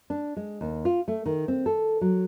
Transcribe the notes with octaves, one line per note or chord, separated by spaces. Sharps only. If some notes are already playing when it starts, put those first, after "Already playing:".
D4
G#3
D#2
F4
A3
D#3
C4
A4
F#3